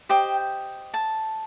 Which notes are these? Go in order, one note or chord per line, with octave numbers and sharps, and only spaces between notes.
G4 C5 D#5 G5
A5